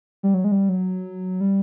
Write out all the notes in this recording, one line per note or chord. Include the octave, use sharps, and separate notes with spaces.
G3
F#3
G#3
G3
F#3
G3